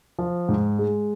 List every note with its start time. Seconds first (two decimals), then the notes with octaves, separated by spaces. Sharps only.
0.19 F3
0.49 G#2
0.79 G#3